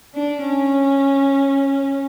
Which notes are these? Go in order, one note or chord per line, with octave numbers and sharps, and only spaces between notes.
D4
C#4